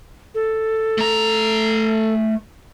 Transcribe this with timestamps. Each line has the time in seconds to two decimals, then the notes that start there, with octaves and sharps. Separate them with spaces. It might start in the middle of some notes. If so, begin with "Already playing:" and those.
0.35 A4
0.98 A3 A#5